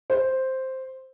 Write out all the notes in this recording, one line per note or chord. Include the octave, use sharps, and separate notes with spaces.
C5